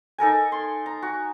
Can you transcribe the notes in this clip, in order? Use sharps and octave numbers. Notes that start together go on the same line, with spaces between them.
D#4 A4 A#4 G#5
C6
A#5
F#4